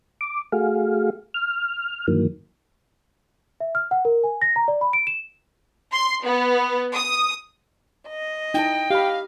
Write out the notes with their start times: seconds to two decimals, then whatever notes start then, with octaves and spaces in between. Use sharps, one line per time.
0.21 D6
0.52 A3 F#4 G#4 F5
1.34 F6
2.08 G2 D#3 E3 F#3 A#3
3.60 E5
3.75 F6
3.91 F#5
4.05 A#4
4.24 G#5
4.42 A#6
4.56 A#5
4.68 D5
4.81 B5
4.93 D7
5.07 E7
5.92 C6
6.24 B3
6.94 D#6
8.07 D#5
8.54 D#4 E4 G5 A5
8.90 G4 F5 B5